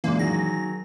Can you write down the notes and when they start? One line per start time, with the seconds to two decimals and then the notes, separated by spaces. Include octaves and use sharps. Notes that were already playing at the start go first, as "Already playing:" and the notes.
0.04 F#2 A#2 E3 G#3 A#3
0.19 D#3 F#3 G#4 A#6